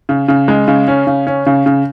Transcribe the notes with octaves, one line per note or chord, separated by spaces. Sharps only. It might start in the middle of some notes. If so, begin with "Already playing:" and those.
C#3
C#3
G#3
C#3
C#4
C#3
C#4
C#3
C#3